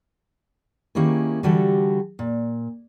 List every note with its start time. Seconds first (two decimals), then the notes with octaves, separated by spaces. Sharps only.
0.95 D#3 A#3 C#4 E4 G4 G#4
1.43 D3 E3 G3 F#4 G4 A4
2.19 A#2